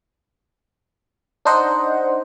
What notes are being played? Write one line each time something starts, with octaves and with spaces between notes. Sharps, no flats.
D4 D#4 C5 D#5 F#5